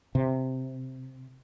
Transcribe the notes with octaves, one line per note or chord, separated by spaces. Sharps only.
C3